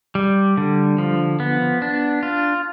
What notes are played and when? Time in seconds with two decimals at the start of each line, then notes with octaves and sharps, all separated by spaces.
0.15 G3
0.57 D3
0.98 F3
1.40 B3
1.82 D4
2.23 F4